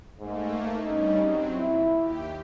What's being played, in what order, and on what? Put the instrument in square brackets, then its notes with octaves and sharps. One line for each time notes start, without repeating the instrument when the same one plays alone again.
[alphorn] G#2 [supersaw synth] A3 A#3
[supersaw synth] G2 G3 C#4 [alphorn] D#4
[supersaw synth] F#3 C4
[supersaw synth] A#2 [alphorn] E4
[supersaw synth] D#2 G4